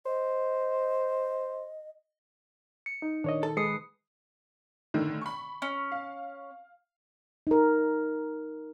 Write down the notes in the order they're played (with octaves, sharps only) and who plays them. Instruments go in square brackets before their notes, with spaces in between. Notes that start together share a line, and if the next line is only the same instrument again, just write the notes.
[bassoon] C5 [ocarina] D#5
[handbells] C#7
[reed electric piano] D#4
[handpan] A#2 D#3 [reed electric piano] D4 C#5 D#5
[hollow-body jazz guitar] A4
[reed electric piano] G#3 [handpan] B4 [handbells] D#6 C7 C#7
[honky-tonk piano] A2 D3 D#3
B5 C#6
[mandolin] C#4
[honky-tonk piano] F5
[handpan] D#4 A#4